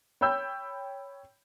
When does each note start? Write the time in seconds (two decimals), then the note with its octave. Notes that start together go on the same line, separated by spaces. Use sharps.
0.21 C#5 G5 B5 E6 G6